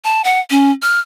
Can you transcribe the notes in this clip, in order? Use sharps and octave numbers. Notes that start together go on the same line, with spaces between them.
A5
F#5
C#4
F6